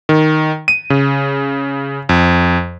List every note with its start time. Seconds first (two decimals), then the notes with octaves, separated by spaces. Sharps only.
0.09 D#3
0.68 D#7
0.90 C#3
2.09 F2